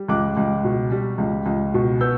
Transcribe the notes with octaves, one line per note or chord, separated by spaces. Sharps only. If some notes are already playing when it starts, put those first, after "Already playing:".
Already playing: G3
C#2 D6 F#6
C#2
B2
G3
C#2
C#2
B2
B3 E6 G6